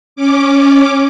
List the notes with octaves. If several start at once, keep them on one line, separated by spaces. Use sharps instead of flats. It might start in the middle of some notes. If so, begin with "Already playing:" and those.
C#4 D6